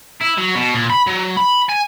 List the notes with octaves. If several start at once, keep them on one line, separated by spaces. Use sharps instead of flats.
E4
F#3
B2
A#2
B5
F#3
B5
G#5